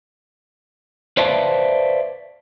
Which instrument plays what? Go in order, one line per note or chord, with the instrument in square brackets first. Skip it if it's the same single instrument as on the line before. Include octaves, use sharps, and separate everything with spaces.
[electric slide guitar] B4 C5 D5 E5 F5 A5